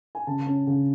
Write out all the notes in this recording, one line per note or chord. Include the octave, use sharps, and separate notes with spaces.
G#5
C#3 A5
C#4
C#3